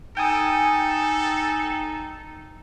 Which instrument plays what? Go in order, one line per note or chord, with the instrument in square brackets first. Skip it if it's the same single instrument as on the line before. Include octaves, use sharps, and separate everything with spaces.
[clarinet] D#4 [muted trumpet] A4 [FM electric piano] G5 G#5 D#6